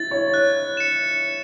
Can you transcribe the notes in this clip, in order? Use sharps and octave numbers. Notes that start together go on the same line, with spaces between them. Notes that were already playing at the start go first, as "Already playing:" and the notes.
Already playing: E4 A6
C#5
F#6
C#7 E7